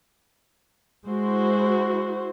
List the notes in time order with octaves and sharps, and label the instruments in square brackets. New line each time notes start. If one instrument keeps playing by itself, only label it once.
[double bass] G#3 [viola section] E4 F#4 C5